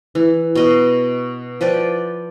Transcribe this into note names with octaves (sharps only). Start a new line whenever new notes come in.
E3
B2 D#5
F3 B4 D5 G5